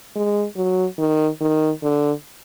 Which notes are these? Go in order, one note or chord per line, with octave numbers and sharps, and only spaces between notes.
G#3
F#3
D#3
D#3
D3